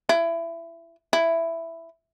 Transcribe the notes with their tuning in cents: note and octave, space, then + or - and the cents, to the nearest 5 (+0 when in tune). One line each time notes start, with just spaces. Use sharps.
E4 +20
E4 +5